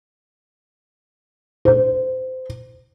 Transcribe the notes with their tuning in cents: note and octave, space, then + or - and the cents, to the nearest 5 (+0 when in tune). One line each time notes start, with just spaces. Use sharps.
C5 -20